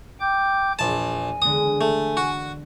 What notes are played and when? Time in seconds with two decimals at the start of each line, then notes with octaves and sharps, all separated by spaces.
0.20 G5 D6 G6
0.79 A#1 E2 G#5 A5
1.42 D3 G#3 B3 D#6
1.81 A3
2.17 F#4